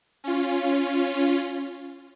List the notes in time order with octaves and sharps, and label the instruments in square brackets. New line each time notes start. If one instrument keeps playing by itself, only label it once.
[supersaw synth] C#4 F4